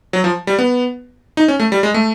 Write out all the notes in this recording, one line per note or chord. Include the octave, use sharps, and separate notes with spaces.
F#3
F3
G3
B3
D#4
C#4
A3
G3
G#3
A3